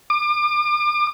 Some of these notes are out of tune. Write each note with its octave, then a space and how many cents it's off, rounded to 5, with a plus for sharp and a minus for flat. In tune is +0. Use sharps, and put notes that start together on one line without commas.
D6 +40